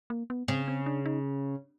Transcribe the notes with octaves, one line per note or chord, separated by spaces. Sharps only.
A#3
B3
C#3 C4
C4
D4
D#4